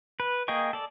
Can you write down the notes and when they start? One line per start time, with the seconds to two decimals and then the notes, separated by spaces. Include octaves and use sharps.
0.20 B4
0.48 A#3 G#4 D#5 G5 C#6
0.73 A4 D5